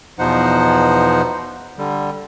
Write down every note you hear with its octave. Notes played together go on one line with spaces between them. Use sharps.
E2 B2 F3 D#4 C5 F#5
D3 G3